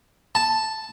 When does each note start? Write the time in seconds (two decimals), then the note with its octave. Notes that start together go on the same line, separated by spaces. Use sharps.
0.35 A5